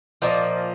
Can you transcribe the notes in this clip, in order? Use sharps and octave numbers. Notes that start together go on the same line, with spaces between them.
A#2 F3 A#3 C5 D#5